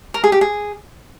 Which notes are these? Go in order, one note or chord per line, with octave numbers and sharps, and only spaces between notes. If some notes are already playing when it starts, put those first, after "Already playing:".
A#4
G#4
G4
G#4